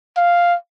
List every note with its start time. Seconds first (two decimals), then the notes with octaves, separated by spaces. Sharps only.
0.17 F5